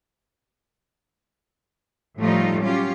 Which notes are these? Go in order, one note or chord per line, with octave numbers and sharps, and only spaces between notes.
A2 F3 G3 A3 D#4 F4
F#3 C#4 F4 G4